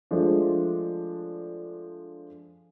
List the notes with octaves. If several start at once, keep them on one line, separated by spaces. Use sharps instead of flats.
F3 G#3 A3 D4